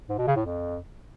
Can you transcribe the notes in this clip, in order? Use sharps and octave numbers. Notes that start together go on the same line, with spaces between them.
G#2
B2
C#3
A2
F2